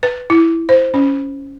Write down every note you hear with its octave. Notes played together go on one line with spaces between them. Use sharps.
B4
E4
C5
C#4